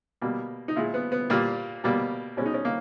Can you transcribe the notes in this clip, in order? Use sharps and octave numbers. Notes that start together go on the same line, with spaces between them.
B2 G3 A#3
D#4
A#2 G#3 E4
B3
B3
A#2 G3 A#3
B2 G3 A#3
B2 G#3 C#4
D#4
C#4
A#3